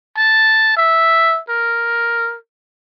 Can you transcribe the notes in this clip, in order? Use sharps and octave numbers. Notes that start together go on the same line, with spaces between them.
A5
E5
A#4